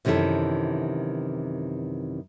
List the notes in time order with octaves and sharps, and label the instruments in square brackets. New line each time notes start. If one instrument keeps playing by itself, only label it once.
[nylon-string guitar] F#2 C3 D#3 E3 E4 A4